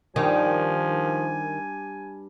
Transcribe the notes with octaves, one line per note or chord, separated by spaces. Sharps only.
G2 D#3 F3 G#5